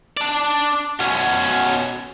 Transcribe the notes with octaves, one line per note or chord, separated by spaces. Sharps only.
D4 D5
B2 C#4